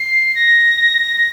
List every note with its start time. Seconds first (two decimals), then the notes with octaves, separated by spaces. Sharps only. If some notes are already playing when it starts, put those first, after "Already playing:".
Already playing: C7
0.35 A#6